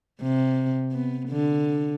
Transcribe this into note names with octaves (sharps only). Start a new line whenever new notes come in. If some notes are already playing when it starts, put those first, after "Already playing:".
C3
B3
D3